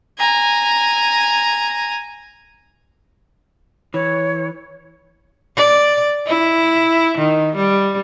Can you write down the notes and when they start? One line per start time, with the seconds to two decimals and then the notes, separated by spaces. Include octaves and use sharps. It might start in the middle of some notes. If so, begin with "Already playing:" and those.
0.18 G#5 A#5
3.94 E3 C#5
5.56 D5
6.28 E4
7.18 D#3
7.56 G3